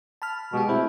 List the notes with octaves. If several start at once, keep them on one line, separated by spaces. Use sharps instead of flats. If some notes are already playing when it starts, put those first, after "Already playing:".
A5 B5 F6
B2 G#3 G4
A3 C4 E4